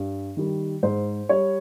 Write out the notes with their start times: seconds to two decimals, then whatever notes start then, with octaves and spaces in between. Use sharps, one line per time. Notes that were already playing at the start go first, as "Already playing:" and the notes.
Already playing: G2
0.37 D#3 G3
0.83 G#2 C5
1.29 G3 C#5